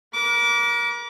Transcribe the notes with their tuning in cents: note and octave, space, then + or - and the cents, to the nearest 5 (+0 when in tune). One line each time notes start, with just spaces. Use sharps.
A#4 +40 D6 -20